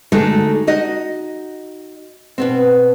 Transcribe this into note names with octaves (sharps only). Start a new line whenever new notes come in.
D3 G#3 A3 D#4 F#4 A4
D#4 F#4 D#5
B2 B3 C4